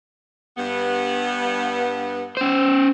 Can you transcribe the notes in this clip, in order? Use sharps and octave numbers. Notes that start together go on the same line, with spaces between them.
G2 B3
C#4 C5